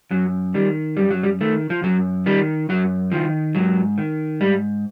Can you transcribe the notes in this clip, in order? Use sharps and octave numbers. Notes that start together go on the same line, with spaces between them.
F#2 F#3
D#3 G3
F#2 G3
F#3
G3
D#3 A3
F3
F#2 F#3
D#3 G3
F#2 F#3
D#3 F3
G#2 F#3
D#3
G#2 G3